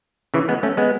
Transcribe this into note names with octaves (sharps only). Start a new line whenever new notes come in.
C#3 E3
G#3 B3
A3 C#4
G#3 B3